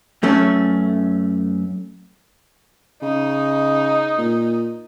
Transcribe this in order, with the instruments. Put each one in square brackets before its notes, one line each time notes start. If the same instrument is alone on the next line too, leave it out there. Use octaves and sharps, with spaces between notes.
[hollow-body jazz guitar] F#2 A3 C#4
[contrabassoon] C#3 [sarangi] D#4
[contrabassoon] A#2